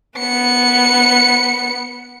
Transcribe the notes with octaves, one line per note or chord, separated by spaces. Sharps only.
B3 C#7